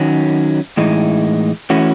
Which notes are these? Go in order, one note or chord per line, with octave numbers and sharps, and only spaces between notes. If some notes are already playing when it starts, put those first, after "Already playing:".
Already playing: D#3 F#3 C#4
A2 E3 G#3 D#4
E3 A3 C#4 F#4